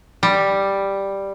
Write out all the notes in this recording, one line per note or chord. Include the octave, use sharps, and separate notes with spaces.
G3